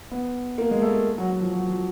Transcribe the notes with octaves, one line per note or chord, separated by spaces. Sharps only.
B3
A#3
G#3
A3
A#3
F#3
F#3
F3
F#3
F3